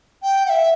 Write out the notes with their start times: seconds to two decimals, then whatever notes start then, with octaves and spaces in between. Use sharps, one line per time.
0.23 G5
0.46 F#5
0.50 E5